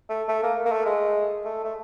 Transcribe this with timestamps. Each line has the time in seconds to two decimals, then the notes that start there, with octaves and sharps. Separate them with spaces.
0.09 A3
0.28 A3
0.43 A#3
0.65 A#3
0.72 A3
0.86 G#3
1.45 A3
1.64 A3